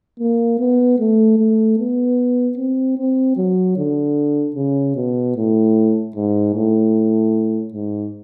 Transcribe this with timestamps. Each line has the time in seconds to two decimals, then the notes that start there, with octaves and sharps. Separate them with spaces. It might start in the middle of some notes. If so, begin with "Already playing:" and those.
0.20 A#3
0.59 B3
0.99 A3
1.38 A3
1.79 B3
2.57 C4
2.98 C4
3.37 F#3
3.77 D3
4.56 C#3
4.96 B2
5.36 A2
6.15 G#2
6.54 A2
7.73 G#2